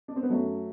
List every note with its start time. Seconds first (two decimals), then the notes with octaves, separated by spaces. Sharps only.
0.08 D4
0.16 C4
0.23 B3
0.30 F#2 F#3 A3